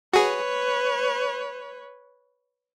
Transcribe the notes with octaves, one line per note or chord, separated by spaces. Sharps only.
F#4 G#4 B4 C#5